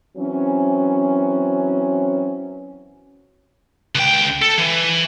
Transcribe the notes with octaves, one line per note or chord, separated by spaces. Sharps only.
E3 F#3 C4 C#4
C#2 G5
A4
E3